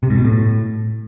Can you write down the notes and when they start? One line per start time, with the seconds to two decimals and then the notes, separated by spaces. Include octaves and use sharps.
0.03 C3
0.10 G#2
0.17 B2
0.25 A2